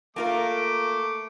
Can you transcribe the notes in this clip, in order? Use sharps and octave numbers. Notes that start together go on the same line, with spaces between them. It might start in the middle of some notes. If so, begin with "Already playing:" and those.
A3 A#3 F4 A#4 D6